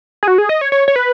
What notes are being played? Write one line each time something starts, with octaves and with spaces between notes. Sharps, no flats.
G#4
F#4
G#4
D#5
C#5
C#5
C#5
B4